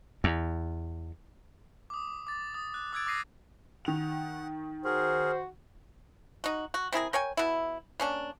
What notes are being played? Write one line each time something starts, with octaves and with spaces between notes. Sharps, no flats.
E2
D6 D#6
D6 A6
D#6
F#6
D6 E6 F#6 G#6 A6 D7
D6 D#6 A#6 C7 D#7
D#3 F#5 F7
F#4 G#4 A#4 C5
D#4 F#4
F#4
C3 E4 G#4 A#4
A#4 C#5 G5 G#5
B2 E4
A#3 C#4 D4